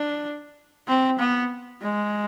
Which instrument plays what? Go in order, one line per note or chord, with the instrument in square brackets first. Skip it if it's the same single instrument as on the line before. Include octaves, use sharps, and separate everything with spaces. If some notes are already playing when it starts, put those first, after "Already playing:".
Already playing: [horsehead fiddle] D4
C4
B3
G#3